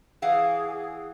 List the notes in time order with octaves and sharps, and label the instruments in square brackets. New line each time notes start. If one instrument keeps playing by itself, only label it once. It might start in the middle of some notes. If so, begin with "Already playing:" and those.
[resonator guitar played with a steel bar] E3 F5 F#5 [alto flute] G#4